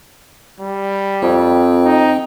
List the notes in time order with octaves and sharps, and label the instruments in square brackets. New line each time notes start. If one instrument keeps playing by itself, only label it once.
[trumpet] G3
[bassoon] F2 [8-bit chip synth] C4 G5
[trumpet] D#4